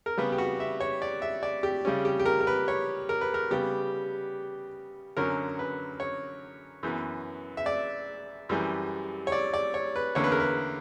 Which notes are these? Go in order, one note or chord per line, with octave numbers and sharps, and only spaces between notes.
A#4
C#3 G3 B3 B4
G4
F#4
E5
C#5
D5
E5
D5
G4
C#3 G3 C#4
G4
G4
A#4
A#4
B4
C#5
A#4
B4
A#4
C#3 G3 B3 G4
F#2 D3 F#3 C#4 A#4
B4
C#5
F#2 E3 B3
E5
D5
F#2 E3 G3
C#5
D5
D5
C#5
B4
E2 D3 A#3 C#4 C#5
B4
A#4
B4